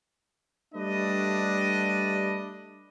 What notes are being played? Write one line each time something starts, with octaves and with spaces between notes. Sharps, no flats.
G3 A3 D4 B4 D5 D#5